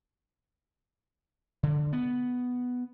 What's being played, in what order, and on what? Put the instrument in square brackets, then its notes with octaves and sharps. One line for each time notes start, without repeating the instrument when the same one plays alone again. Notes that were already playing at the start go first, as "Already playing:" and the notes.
[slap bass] D3
B3